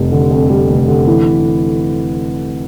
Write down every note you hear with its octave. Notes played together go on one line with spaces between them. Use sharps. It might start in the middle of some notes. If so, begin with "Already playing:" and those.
Already playing: F1 F2 G3
D3
F2
G3
F1
D3
E3